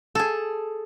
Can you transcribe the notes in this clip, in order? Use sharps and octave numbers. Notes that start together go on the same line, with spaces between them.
G#4 A4